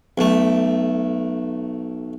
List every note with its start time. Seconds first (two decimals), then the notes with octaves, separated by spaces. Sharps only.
0.18 B1 A3